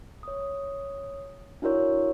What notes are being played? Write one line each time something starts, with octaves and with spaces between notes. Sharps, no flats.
C#5 D#6
D4 E4 F#4 A#4 C#5